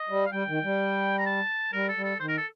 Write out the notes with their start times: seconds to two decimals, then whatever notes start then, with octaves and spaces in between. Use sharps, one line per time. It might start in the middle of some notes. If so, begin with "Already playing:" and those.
Already playing: D#5
0.09 G3
0.26 F5
0.32 G3 G5
0.48 D#3
0.64 G3
1.18 A#5
1.26 A5
1.73 G3 A#4
1.89 A4
1.97 G3
2.04 A4
2.20 D#3 C5
2.29 A#4
2.38 A4